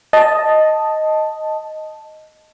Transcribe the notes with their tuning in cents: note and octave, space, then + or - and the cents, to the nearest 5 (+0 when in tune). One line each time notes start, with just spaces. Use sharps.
D#5 +0 A5 +0